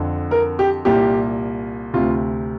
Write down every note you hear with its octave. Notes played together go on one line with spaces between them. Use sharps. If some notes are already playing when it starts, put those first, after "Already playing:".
Already playing: F2 D3
A#4
G4
C2 A#2 G4
D2 C3 F4